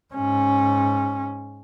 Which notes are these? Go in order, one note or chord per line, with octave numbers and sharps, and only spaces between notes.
G#2 C#4